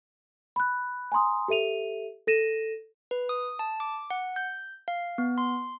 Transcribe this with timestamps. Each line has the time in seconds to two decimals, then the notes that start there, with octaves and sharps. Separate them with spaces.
0.56 B5 F#6
1.12 G#5 A#5 C6 D#6
1.48 G4 A4 E5 D#7 F7
2.27 A4 A#6 D#7 E7
3.11 B4
3.29 D#6
3.59 A5
3.80 D6
4.10 F#5
4.36 G6
4.88 F5
5.18 B3
5.38 C6